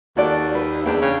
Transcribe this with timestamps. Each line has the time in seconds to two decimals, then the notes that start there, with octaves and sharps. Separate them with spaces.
0.17 D#2 F#4 A4 D5
0.55 B4
0.86 E2 D4 G5
1.01 C#3